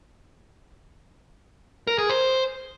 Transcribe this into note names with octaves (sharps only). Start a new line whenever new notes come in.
A#4
G#4
C5